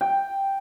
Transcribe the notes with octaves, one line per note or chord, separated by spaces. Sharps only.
G5